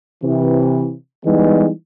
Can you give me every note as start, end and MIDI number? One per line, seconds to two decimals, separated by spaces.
0.22 0.94 48
0.22 0.94 52
1.24 1.68 52
1.24 1.68 55
1.24 1.68 56
1.24 1.68 59
1.24 1.68 63